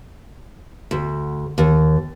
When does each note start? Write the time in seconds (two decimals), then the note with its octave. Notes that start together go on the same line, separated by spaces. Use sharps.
0.91 D2
1.58 D#2